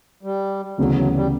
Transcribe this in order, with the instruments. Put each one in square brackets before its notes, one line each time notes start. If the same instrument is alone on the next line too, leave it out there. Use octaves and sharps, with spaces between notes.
[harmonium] G3
[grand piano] D2 C#3 E3 B3 [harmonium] F#3
[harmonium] F#3
G3